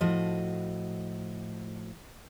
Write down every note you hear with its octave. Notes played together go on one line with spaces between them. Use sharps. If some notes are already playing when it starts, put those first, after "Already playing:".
A2 F3 F#4 D#5